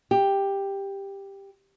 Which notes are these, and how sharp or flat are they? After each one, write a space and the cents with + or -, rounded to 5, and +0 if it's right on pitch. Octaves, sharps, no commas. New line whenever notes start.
G4 +10